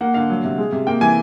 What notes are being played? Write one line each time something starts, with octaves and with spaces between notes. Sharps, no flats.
A#3 F#5
D3 F5
F#3
C3
G#3
C3
A#3 G5
E3 G#5